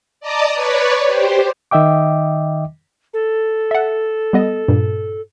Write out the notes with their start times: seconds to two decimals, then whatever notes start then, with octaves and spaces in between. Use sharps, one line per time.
0.20 D5 D#5 A5 A#5 D6 D#6
0.53 B4 C#5 D5
1.07 G4 C5
1.71 D#3 D#5 E5 G5 D6
3.13 A4
3.71 E5 F#5
4.33 G3 B3 D#5
4.68 G2 A#2